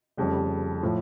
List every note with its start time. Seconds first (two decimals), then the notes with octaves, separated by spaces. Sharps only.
0.17 F1 F2 C#3 G3
0.83 A2 F3